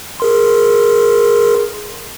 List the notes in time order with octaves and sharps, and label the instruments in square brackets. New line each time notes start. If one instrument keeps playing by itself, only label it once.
[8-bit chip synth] G#4 A#4 C6